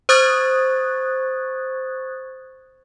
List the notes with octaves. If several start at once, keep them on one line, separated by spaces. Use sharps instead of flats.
C5 C#6 D#6 F#6 G#6 A6